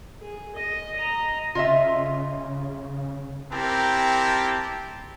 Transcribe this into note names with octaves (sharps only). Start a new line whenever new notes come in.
G#4
D#5
D#5 A#5
C#3 F4 D#5 E5
C4 E4 G4 A#4 G5 A5